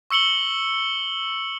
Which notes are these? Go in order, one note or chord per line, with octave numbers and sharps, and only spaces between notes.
C#6 E6 C#7 F#7 G7